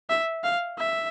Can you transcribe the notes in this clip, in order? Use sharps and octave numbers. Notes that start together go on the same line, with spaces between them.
E5
F5
E5